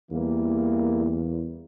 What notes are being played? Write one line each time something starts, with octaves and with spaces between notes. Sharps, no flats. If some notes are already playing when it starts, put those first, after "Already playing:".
E2 E3 G3 A#3